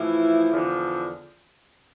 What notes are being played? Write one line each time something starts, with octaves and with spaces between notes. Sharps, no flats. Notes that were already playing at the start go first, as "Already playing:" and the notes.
Already playing: A2 E3 F3 E4
E2 D3 F3